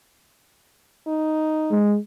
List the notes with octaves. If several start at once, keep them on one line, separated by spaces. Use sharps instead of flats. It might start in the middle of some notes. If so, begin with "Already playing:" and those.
D#4
G#3